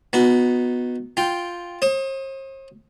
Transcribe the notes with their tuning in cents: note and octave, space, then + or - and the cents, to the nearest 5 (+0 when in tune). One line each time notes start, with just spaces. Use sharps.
B3 +0 D#4 +0 F#4 -25
F4 +0 G5 +0
C5 +45 D#6 +10